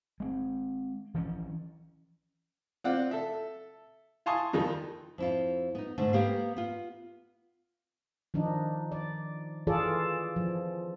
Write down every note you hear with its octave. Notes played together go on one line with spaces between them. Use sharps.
G#3 B3 C4
E3 F3 A#3 C#4
C4 F4 D5 F#5
A4 E5
F5 G#5 A5 C6 C#6 D#6
F2 D#3 F3 G3
F2 E4 F4
B3 D#4
G#2 D3 A3
A#3 B3 G4 A#4 F5
B3 F4
D#3 F3 D4 D#4
D5
E3 F4 G#4 A4 D5
F3